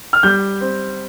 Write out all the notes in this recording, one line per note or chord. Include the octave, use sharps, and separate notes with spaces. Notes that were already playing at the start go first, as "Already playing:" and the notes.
F6
G3 G6
C4